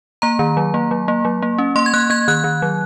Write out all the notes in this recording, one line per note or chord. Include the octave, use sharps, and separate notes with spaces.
A#3 A#5
D#3
F#3
A#3
F#3
A#3
F#3
A#3
C#4
A#3 C6
G#6
A#3 F#6
A#3 G#6
D#3 F#6
D#3
F#3